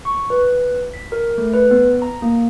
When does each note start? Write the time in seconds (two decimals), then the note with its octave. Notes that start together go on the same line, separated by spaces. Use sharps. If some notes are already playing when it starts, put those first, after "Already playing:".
0.05 C#6
0.30 B4
0.94 B6
1.12 A#4
1.38 A3
1.53 B4
1.71 B3
2.02 A#5
2.22 A#3